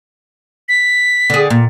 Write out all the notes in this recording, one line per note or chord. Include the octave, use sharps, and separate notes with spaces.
B6
D3 G#4
A#2